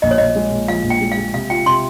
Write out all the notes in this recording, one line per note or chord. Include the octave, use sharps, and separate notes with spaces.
A#1 D#5
C#5
A#1 D#5
G#3
A#2
F3 F5
A#1
G5
G#3
F5
G#3
C3 F5
F4 G5
C3 C6